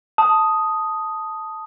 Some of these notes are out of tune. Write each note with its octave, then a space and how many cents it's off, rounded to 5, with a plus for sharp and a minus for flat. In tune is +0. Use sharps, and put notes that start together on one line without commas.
A5 +0 D#6 +0